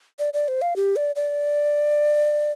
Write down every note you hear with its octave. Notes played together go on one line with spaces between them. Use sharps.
D5
D5
C5
F5
G4
D5
D5